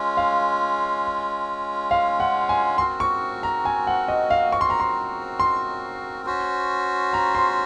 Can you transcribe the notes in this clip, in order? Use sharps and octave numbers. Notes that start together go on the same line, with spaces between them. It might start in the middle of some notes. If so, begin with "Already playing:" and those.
Already playing: G#3 C#4 F4
F5
F5
F#5
G#5
C4 F#4 A#4 C6
C#6
A#5
G#5
F#5
D#5
F5
C#6
C6
A#5
C6
C6
C#4 F#4 C5
A#5
C6